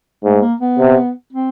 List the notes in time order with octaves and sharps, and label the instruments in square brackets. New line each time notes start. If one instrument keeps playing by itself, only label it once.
[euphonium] G#2 [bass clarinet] A3
[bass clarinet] A#3
B3
[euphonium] C3
[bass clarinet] C4